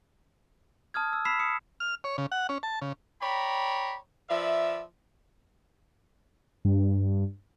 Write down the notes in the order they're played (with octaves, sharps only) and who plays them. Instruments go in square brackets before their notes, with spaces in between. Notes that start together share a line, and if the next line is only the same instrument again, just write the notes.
[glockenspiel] A5 D#6 F6 G#6
E6
B5 E6 B6 C7 E7
D#6 C#7
[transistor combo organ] F6
C#5
C#3
F#5
C#4
A5
C#3
[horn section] C#5 D5 G5 A#5 B5
F3 B4 D5 E5
[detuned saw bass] G2